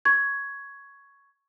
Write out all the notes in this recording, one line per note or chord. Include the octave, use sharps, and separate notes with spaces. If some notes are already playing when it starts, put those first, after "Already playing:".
C#6 G#6